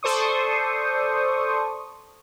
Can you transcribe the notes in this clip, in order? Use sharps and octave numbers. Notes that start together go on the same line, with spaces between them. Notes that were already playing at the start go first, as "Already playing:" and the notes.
A4 C5 D5 C#6 D#6